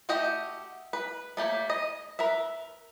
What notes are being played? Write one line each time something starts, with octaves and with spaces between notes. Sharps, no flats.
A3 F#4 G4 D#5 G5
B4
A3 A#3 G4 C#5
D#5
A#4 B4 E5